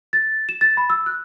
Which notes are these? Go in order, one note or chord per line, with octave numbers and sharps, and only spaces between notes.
A6
E7
A6
B5
E6
F#6